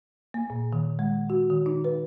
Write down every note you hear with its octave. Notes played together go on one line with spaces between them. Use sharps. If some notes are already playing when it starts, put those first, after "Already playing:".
A#3
A#2
D#3
G#3
F#4
D#3
D#4
B4